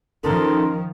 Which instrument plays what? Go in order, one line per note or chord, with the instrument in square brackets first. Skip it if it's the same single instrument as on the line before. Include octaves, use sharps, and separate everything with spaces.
[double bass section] D#3 F3 [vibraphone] C#4 D#4 C6 [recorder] A4 [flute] A#4